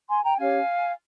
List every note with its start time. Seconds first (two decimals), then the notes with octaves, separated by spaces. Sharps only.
0.09 G#5 C6
0.24 G5 A#5
0.38 C#4 G4 C#5 F5 G#5